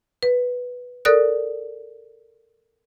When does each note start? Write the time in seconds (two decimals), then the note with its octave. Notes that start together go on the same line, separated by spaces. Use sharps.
0.23 B4
1.05 A4 A#4 D5 D#6 F#6